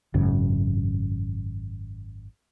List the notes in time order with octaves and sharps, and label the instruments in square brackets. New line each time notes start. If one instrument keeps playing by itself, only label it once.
[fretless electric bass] G#1 F#2 C#3